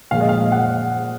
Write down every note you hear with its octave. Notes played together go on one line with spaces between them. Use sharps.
A#2 F3 G#3 F5
D#5
F5
F#5